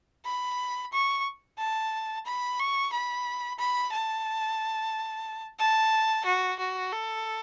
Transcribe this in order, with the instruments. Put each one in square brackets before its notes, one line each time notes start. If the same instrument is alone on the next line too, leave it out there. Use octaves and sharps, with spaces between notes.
[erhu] B5
C#6
A5
B5
C#6
B5
B5
A5
A5
F#4
F#4
A4